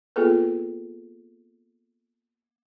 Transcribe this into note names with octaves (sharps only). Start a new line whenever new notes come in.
A#3 B3 F4 G#4 A4 B4